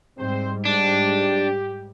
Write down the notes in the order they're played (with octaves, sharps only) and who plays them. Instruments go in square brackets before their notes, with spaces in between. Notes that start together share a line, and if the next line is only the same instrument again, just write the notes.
[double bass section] G#2 G3 [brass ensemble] C4 C5
[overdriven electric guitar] D4 [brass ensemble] G4